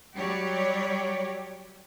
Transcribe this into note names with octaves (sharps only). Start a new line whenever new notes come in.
F#3 G3 G4 C#5 D5